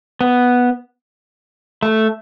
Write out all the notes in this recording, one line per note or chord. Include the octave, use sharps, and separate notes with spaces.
B3
A3